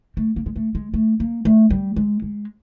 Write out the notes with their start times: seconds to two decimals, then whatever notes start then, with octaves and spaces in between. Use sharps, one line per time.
0.17 A3
0.36 A#3
0.46 G#3
0.56 A3
0.75 G#3
0.94 A3
1.20 A#3
1.45 A3
1.70 G3
1.96 G#3
2.22 G#3